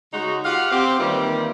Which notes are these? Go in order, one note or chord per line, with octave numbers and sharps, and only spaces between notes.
C#3 G#3 D#4 F#4
F4 G4 F5 F#5
C4 G4
D#3 E3 G3 A#3 F4